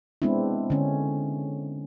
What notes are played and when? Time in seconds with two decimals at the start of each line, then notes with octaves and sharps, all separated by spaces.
0.22 G#3 B3 C4 D4 E4
0.70 D3 C#4